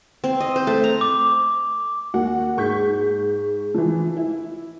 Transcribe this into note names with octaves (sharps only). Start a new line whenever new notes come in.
C4
D#5
C5
A3
A#5
D6
D#2 F#4 F#5
G#2 C#6 G6 B6
E3 F3
E4